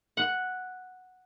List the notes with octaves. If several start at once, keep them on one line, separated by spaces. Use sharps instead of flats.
F#5